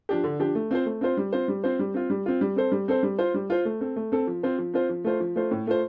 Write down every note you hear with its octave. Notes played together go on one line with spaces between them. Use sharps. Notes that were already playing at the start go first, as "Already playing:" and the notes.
F3 D4 G4
D3
F3 D4 G4
A3
C4 F4 C5
A3
C4 F4 C5
G3
C4 F4 C5
G3
C4 F4 C5
G3
C4 F4
G3
C4 F4
G3
C4 A4 C5
G3
C4 A4 C5
G3
F4 C5
G3
F4 C5
A3
C4 A4
A3
C4 A4
F3
C4 F4 C5
F3
C4 F4 C5
F3
A3 F4 C5
F3
A3 F4 C5
A2
A3 F4 C5